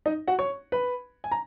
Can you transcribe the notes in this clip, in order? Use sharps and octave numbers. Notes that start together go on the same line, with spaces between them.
D#4 D#5
F#4 F#5
C#5 C#6
B4 B5
G#5
A#5